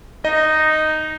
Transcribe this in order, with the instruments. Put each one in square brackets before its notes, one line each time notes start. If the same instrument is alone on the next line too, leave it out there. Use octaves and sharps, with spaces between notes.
[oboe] D#4 [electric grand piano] D#5